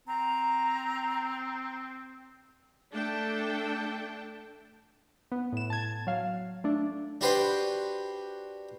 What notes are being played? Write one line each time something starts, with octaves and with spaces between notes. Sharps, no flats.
C4 A#5
A3 D4 G5 A5
B3
A2 E7
A5 G#6
F#3 F5
A3 D4
D4 F#4 G4 B4 C5 D5